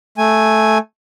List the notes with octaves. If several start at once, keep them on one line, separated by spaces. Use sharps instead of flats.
A3 G#5